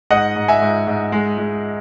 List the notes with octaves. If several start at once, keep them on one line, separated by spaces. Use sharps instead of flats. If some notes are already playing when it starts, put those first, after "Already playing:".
G#2 D#5 F#5
G#2
E5 G#5
G#2
G#2
G#3
G#3